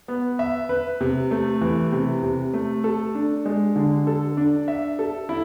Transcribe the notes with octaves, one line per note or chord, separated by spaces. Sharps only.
B3
E5
B4
C3
A3
E3
C3
C3
A3
A4
D4
G#3
D3
A4
D4
E5
A4
E4